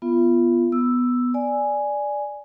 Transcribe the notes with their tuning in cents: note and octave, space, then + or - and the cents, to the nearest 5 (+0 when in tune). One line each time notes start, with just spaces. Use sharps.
B3 +0 F4 -20 E5 +45
B3 +0 E6 +0
D5 +0 G#5 +0